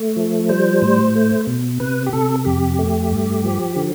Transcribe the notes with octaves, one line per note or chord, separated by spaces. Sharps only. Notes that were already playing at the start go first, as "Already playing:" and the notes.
Already playing: A3
F3
G3 C5
A2
A3
B2
C3 B4
G4
C3 A4
F2 G4
A3
G2
F3
D3